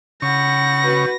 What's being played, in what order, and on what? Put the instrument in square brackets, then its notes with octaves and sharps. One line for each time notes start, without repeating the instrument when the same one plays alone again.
[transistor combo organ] C#3 C#6 [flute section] F#5 B5 G6 [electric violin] A#6
[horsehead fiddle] F#4 B4